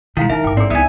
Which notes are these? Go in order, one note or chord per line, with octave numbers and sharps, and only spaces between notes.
B2 D#3 G#3 E4 F5 A#5
D#3 D#4 A#4 E5
A1 G#2 G5 D6
C4 G#4 D5
C#2 B3 D#4 E4 E5 G#5